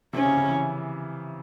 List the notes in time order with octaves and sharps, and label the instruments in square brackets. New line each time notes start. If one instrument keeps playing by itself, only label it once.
[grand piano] C3 [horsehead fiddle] C#4
[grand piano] C#3
C#3
E3